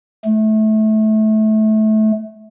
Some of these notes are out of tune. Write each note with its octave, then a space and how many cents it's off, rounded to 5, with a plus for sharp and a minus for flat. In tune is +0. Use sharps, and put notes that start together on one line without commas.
A3 -20